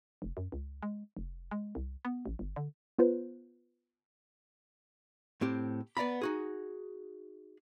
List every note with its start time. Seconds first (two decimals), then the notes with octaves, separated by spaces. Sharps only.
0.22 F1
0.37 F#2
0.52 C#2
0.83 G#3
1.17 F1
1.51 G#3
1.75 C2
2.05 B3
2.26 A1
2.39 G1
2.56 D3
2.99 B3 F4 B4 C5
5.41 A2 C4 G4
5.97 B3 D5 A#5 B5
6.22 D#4 F#4 G#4